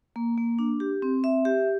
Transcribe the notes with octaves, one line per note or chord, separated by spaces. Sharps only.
A#3
A#3
D4
G4
C4
E5
G4